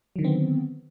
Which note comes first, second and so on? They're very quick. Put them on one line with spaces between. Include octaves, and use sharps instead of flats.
F#3 D#3 D3 C4 B3